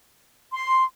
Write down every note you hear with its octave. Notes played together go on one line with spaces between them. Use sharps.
C6